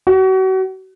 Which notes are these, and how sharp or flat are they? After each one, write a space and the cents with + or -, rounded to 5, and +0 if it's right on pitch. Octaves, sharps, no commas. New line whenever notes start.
F#4 +35